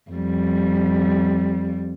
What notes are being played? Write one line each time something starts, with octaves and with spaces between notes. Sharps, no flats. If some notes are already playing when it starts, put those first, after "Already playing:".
F2 G3